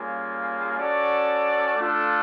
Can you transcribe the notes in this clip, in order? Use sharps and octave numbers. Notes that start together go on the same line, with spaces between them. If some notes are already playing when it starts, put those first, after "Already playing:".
Already playing: G3 A#3 C#4 F4 G#4
C#4 F#4 A4 D5
A3 D4 F4 A4